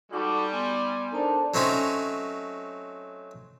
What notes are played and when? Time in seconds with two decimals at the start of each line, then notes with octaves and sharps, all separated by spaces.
0.12 G3 D#4 F#4 A4 D6
0.52 B3 G#5 C6
1.13 D4 D#4 A4 A#4 C5 A5
1.54 F#3 A3 C4 C#4 D#4